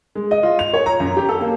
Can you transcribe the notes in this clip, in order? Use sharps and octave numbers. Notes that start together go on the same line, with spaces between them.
G#3
D#5
F4
F7
C#5
A#5
F#2
G4
A4
A#3